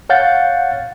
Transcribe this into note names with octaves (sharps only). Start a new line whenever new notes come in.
C#5 F5 F#5 G6 A6